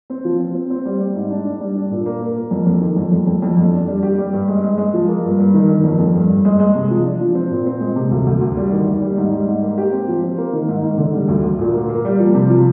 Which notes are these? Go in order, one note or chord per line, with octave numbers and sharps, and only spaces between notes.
C4
F3
C4
C4
C4
G3
G3
G#2
D4
D4
G3
D4
A#2
A#3
A#3
A#3
F2
F2
D#3
F2
F2
F2
F2
F2
D4
G3
G4
G3
G2
G#3
G#3
G#3
F3
A#3
G2
G2
D#3
D#3
F2
F2
G2
G2
G#3
G#3
C3
F3
D4
F3
C4
A#2
C4
G#3
C3
D2
D2
D2
G3
D#3
D#2
G3
G#2
G3
G#2
A#3
G4
C4
F3
C4
A#3
D#3
G#2
G#2
D3
G3
D2
D2
A#2
A#3
A#3
G3
F3
C3
F3